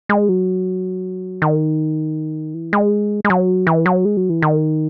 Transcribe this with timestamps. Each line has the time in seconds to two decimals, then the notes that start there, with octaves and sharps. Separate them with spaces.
0.09 G#3
0.29 F#3
1.42 D#3
2.54 E3
2.73 G#3
3.25 G#3
3.30 F#3
3.67 E3
3.86 F#3
4.05 G#3
4.17 F#3
4.29 E3
4.42 D#3